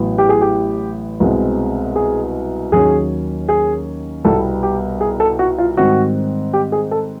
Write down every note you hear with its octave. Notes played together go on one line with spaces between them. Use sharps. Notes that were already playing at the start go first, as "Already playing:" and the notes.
Already playing: A1 A2 F#3 B3
G4
G#4
G4
C2 B2 G#3 C4
G#4
D#2 D#3 F#3 A#3 C#4 G#4
G#4
C2 B2 G3 B3 A4
G4
G#4
A4
F#4
F4
G#2 D#3 G3 C4 F#4
G4
G#4
A4